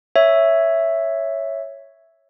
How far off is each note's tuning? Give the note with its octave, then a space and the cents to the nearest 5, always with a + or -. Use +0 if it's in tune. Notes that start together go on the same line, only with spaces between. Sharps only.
C#5 +0 E5 +0